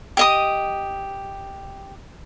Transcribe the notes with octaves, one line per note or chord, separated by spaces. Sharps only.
G4 D#5 D#6